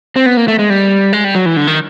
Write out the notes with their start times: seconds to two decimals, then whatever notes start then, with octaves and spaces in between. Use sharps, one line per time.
0.16 C4
0.26 B3
0.37 A#3
0.48 A3
0.59 G#3
0.70 G3
1.13 G#3
1.24 G3
1.35 F#3
1.46 E3
1.57 D3
1.67 D#3